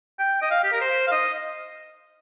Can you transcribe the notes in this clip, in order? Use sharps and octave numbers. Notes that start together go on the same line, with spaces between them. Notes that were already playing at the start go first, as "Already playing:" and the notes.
G5
D#5
F5
G4
A#4
C5
F5
D#5